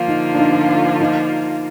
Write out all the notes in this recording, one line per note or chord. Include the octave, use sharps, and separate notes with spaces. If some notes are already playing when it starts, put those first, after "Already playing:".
Already playing: D3 F3 A#3 F4
D#4
D4
D#4
D#4